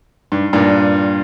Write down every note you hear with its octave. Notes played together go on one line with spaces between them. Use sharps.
G2
G2 A#2